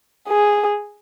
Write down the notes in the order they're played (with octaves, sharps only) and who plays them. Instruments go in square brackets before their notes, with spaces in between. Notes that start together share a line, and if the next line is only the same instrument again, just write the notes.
[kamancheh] G#4